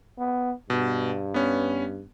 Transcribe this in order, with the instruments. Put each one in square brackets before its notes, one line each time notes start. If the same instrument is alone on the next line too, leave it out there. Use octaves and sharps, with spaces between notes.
[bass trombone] B3
[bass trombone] G2 [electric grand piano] B2
[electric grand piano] B3 C#4